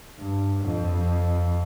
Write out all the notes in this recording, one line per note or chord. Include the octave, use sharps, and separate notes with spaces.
G2
F2